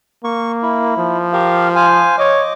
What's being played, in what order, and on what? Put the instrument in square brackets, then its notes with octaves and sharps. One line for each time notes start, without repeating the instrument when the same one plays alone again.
[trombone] A#3 [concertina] C#6
[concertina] E4
[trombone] F3
[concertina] G4 A#4 F5
C5 F5 G#5
[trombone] C#5 [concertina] D#5 D6